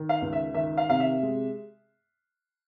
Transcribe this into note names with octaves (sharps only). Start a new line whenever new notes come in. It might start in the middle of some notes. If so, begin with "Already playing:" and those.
Already playing: D#3
F5
C#2
E5
D#3 E5
F5
C3 F5
E5
G#3